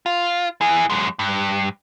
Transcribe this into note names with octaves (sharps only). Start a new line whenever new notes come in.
F4
E4 G#4
F#2 G#3
G2